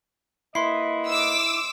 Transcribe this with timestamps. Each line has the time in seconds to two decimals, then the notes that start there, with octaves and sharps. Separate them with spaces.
0.55 A#3 E4 B4 D#5 C6 C7
1.08 D6 E6